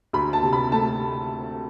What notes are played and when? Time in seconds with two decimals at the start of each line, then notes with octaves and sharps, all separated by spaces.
0.13 D2 B5
0.33 A5
0.43 C3
0.53 B5
0.72 A3 A5